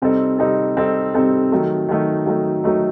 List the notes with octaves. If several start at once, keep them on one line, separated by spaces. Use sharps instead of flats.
C3 G3 C4 D#4 A4
C3 G3 C4 D#4 A4
C3 G3 C4 D#4 A4
C3 G3 C4 D#4 A4
D#3 F#3 A3 D#4
D#3 F#3 A3 D#4
D#3 F#3 A3 D#4
D#3 F#3 A3 D#4